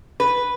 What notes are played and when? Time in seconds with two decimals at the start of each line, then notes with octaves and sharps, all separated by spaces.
0.20 B4